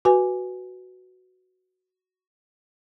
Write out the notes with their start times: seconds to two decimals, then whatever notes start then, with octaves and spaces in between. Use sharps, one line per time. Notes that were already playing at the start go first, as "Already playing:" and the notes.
0.05 F#4 B4 G#5